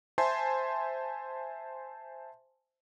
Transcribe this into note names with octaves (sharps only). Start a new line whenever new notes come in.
C5 E5 G#5 A5 C6